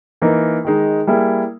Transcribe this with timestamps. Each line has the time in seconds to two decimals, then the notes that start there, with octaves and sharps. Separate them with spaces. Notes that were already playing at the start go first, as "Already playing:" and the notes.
0.22 E3 A#3 D#4 A#4
0.65 D#3 G#3 D#4
1.07 G3 A#3 E4 G#4